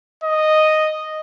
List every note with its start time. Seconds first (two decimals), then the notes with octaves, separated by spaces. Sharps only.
0.23 D#5